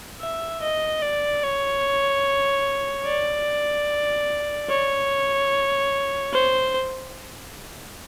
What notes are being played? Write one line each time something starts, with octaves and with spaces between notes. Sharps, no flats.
E5
D#5
D5
C#5
D5
C#5
C5